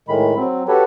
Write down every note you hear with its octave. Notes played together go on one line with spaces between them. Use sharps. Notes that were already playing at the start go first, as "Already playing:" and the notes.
A2 D#3 G#3 B5
F#3 C4
F#4 G4 A4 B4 C#5